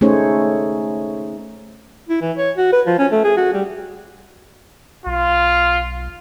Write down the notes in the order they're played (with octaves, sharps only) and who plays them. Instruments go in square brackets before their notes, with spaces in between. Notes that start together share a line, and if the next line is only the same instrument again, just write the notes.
[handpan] A3 C#4 D#4 G#4 C5 C#5
[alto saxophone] E4
E3
C#5
F#4
B4
F3
C#4
A3
G#4
F#4
G3
[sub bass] B1 [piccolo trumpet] F4